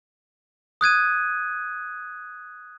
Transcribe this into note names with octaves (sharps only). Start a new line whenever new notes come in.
D#6 F#6 G#6 D#7